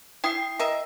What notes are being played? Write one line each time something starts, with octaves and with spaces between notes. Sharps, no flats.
E4 G5 D#6 C7
A#4 D#5 E5